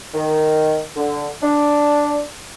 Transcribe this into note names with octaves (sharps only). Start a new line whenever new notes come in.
D#3
D3
D4